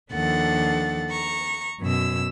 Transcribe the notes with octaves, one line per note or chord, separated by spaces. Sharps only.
D#2 F3 D4 A4 F#5 A6
A#5 C#6
F#2 B2 E6